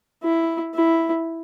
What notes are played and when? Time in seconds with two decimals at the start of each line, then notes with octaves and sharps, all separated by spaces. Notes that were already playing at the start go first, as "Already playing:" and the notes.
0.23 E4
0.75 E4